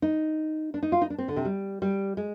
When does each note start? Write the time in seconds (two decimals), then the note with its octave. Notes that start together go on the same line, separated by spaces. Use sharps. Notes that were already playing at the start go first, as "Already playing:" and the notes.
0.02 D#4
0.74 D4
0.83 D#4
0.92 F4
1.01 D#4
1.10 D4
1.18 C4
1.28 D3
1.36 C3
1.45 G3
1.82 G3
2.17 G#3